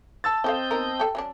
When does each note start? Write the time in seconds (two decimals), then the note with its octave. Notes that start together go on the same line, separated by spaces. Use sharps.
0.24 A5 E6 A6
0.44 F3 C4 A4 D#5 F5 G6
0.71 B3 D#4 A#4
0.99 G4 A4
1.15 F#3 C#4 D4